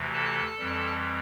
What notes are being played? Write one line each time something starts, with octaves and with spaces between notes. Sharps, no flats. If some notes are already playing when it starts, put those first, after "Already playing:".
Already playing: D2 C3 E3
A4 A5
F2 E3 G3